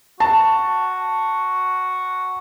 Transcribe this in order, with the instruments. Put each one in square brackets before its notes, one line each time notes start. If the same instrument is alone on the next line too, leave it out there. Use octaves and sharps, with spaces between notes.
[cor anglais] F#4 [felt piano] A5